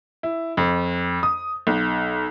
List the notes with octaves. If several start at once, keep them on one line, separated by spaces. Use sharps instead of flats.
E4
F2
D#6
B1